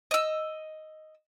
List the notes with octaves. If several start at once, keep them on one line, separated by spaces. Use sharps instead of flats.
D#5 E6